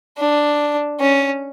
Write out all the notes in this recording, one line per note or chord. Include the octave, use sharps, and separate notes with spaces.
D4
C#4